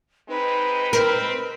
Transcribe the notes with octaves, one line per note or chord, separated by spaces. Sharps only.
G#3 C4 D#4 B4
C4 A#4